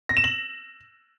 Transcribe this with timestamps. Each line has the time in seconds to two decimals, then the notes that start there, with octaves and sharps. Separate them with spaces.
0.09 A#6
0.17 E7
0.24 F#7